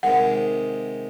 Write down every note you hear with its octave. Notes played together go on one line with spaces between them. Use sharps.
C3 D#3 G#3 F#5